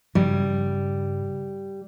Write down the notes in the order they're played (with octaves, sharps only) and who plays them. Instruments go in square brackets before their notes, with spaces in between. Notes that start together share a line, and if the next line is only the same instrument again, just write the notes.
[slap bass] G2 C#3 [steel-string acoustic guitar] G3